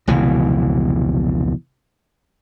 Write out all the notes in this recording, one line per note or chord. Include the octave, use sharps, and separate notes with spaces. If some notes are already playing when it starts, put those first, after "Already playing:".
F1 C#2 B2 E3